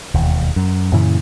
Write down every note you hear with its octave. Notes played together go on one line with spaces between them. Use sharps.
E1 D#2
F#2
F#2 A#2 C#3 E3